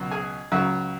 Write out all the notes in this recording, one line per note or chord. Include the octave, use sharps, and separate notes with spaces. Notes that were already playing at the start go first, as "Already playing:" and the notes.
Already playing: C#2 B2 F#3
G#4 G#5
C#2 C#3 F#3